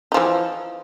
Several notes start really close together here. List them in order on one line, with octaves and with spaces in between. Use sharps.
D#4 F3 E3